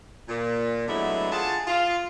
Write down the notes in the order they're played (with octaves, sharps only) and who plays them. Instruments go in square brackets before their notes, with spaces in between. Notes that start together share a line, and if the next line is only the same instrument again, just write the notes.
[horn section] A#2
D3 F#3 G#3 A3 B3 E4
F4 G#4 F#5 A5
F4